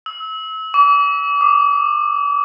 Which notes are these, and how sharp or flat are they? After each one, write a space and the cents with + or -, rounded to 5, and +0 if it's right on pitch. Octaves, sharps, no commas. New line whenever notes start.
E6 -30
D6 -40
D6 +25